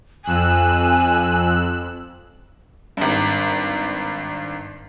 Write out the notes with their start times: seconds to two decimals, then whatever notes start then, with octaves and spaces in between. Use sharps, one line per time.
0.25 F2 G#5 E6 F#6
2.97 G#1 G2